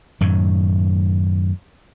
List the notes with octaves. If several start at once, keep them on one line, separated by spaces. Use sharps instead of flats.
F#2 A2 D#3